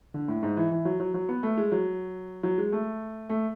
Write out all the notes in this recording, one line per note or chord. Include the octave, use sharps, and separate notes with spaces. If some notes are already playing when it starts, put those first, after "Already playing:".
D3
A2
G#2
E3
E3
F#3
F#3
F#3
B3
A3
G#3
F#3
F#3
G#3
A3
A3